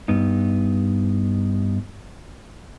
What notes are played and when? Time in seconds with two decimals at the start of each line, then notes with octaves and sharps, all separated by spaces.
0.08 G2 B3 D#4